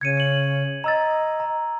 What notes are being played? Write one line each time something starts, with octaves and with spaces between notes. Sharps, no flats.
C#3 G#6 C#7 D#7
C#7 F#7
D#5 A#5 E6 A6
A#5